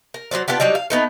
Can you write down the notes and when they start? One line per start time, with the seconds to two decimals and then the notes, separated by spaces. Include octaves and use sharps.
0.14 A#4
0.31 F#3 A#3 C5 D5
0.48 B3 D4 F4 G4
0.60 F#3 G3 D4 D#4
0.75 F5
0.90 A3 B3 D#4 A4